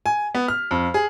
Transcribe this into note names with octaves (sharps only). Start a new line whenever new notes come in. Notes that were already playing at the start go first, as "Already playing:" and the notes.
G#5
B3
F6
F2
G#4